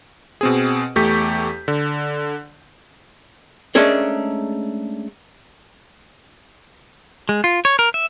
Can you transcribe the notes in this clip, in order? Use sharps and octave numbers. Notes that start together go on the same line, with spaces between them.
B2 C4 G#4
E2 A3 G4 C#6 G6 B6
D3
G#3 A3 C#4 D4 G#4 A#4
G#3
F4
C#5
A#4
E5